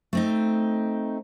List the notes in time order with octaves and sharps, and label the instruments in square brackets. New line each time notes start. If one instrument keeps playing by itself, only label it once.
[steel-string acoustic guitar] A3 C4 D#4